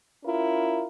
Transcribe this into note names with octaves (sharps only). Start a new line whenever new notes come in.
C#4 E4 F4 A#4